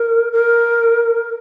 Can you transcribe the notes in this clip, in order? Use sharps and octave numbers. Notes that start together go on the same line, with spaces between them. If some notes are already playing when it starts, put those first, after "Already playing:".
Already playing: A#4
A#4